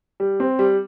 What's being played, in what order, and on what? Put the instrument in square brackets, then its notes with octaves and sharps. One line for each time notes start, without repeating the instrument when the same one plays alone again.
[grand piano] G3
C4
G3